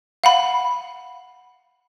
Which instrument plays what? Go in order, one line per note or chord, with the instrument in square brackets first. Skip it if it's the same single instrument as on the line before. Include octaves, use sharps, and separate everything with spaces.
[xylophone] F5 F#5 B5